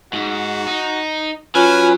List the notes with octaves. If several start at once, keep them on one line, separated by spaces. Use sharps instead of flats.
G#2 F#4
D#4
F#3 C#4 F4 B4 G#5